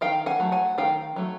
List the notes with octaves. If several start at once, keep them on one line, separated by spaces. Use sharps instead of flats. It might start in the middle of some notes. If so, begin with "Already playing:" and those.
D#3 F5 G5
F#5 G#5
F#3 A3
F#5 G#5
D#3 F5 G5
F#3 A3